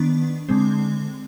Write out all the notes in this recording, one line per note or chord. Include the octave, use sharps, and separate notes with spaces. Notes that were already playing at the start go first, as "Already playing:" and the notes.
Already playing: D#3 B3 D4
D3 G#3 C4